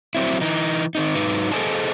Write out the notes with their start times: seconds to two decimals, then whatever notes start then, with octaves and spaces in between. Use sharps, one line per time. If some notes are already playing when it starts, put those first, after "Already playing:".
0.15 F#3 C4 E4
0.41 E3 D#4
0.95 D#3 C4 D#4
1.15 G#2 F#3 D#4 B4
1.52 G#4 A4 C5 D#5 G#5 A5